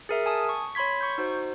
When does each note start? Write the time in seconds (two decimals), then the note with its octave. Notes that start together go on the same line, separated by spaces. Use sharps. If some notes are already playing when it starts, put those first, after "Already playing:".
0.09 G#4 A#4 E5
0.26 G#5 A5 D#6
0.49 C#6
0.75 C#5 B5 C6 G#6 B6
1.01 C#6 G6
1.18 D#4 F#4 C5